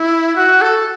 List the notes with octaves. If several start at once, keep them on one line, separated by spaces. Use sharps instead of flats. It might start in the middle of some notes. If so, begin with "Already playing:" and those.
Already playing: E4
F#4
A4